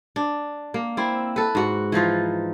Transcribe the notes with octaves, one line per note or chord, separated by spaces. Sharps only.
D4
A#3
C4 E4
A4 B4
G#2 F#4
E3 F3 D#4 F4